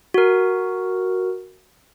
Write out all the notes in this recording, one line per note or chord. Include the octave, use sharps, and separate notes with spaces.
F#4 A#4